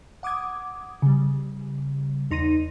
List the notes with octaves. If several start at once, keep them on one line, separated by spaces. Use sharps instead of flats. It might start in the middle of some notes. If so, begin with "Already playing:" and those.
F#5 D6 D#6 G#6
C#3 G3
E2 D#4 C6 A#6 D#7